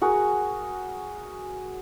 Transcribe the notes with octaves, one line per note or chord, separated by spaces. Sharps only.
F#4 G#4 A#4